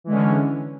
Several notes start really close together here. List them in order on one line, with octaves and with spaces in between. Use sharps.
E3 G#3 D3 C#4